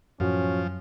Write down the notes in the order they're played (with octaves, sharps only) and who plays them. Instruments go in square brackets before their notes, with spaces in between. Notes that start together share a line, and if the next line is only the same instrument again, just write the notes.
[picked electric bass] F#2 [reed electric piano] A2 F#4 [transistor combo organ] F3 [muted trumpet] C#4